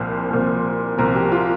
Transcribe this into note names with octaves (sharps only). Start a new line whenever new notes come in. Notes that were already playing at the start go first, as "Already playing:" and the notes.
Already playing: C2 A#2 F3 C5
C2 A#2 F3
C2 A#2 F3 A#4
G4
F4